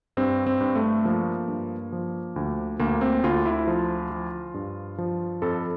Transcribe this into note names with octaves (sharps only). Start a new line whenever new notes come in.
G2 C4
C4
G2
A3
F3 A#3
G2
F3
D2
D2 A#3
C4
D2 F4
E4
F3 F4
F3
G2
F3
F2 A4